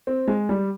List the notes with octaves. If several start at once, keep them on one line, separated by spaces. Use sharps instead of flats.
C4
G#3
G3